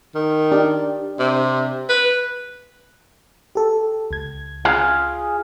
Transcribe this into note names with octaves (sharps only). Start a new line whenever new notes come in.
D#3
D4 G4 D5
C3
B4
G4 A4
C#2 G#6
F4 G#4 F5